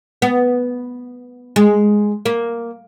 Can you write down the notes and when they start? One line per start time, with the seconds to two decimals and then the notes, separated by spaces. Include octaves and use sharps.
0.22 B3
1.56 G#3
2.26 A#3